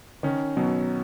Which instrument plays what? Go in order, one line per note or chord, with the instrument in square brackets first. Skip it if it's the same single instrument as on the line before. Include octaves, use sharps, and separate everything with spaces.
[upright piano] D#3 [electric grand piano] C#4
[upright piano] B2 [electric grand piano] F#3